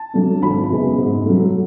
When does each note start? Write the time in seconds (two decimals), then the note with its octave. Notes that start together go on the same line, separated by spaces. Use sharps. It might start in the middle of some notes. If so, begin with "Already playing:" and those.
Already playing: A5
0.14 F#3 A3 D4
0.42 G#1 B5
0.70 F#2 C#3 G#3 B3
0.98 G#2
1.26 F#3 A3